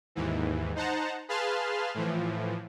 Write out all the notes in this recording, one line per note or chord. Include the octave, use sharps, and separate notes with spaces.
D#2 G#2 E3
D#4 C5 F#5 A5 A#5
G#4 B4 F5 A5 C6 F6
A2 E3 F3